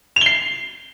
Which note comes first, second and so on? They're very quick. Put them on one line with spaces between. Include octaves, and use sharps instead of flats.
F7 G7 C7